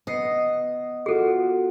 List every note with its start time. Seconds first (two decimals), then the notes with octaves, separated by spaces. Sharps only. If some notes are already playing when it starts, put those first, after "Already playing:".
0.07 B3 D#5 C7 C#7
1.06 F4 F#4 G#4 A4 C7